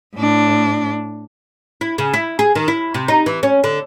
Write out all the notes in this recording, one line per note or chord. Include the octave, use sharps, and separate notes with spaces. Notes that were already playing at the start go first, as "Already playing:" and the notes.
A2 D4
E4
C#3
E4
G#4
D#3
E4
C3
D#4
E3
C#4
D3